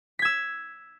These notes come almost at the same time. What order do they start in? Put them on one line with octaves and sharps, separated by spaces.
B6 G#6 E6